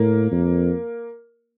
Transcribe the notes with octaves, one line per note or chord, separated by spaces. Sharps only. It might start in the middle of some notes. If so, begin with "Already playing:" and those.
Already playing: A2 A#3
F2